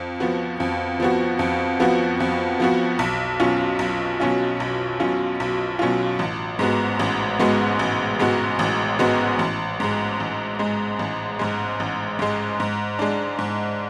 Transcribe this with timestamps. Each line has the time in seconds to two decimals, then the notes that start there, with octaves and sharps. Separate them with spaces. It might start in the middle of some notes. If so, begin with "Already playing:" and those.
Already playing: F2
0.20 F3 B3 F#4
0.60 F2
1.00 F3 B3 F#4
1.39 F2
1.80 F3 B3 F#4
2.20 F2
2.60 F3 B3 F#4
2.99 B1
3.40 B2 F#3 C#4 F4
3.79 B1
4.20 B2 F#3 C#4 F4
4.60 B1
5.00 B2 F#3 C#4 F4
5.40 B1
5.79 B2 F#3 C#4 F4
6.19 A1
6.59 G#2 G#3 B3 F#4
6.99 A1
7.39 G#2 G#3 B3 F#4
7.79 A1
8.19 G#2 G#3 B3 F#4
8.59 A1
8.99 G#2 G#3 B3 F#4
9.39 A1
9.80 G#2 G#3
10.20 A1
10.59 G#2 G#3
10.99 A1
11.39 G#2 G#3
11.80 A1
12.19 G#2 G#3
12.60 G#2
12.99 G#3 D4
13.39 G#2